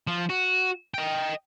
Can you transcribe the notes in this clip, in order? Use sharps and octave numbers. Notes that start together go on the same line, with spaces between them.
F3
F#4
D#5 G5